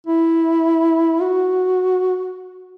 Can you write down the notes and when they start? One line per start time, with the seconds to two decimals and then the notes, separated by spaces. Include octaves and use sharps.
0.07 E4
1.21 F#4